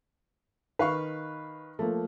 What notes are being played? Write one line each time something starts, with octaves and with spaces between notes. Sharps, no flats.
D#3 B4 F5 C#6
F3 A3 A#3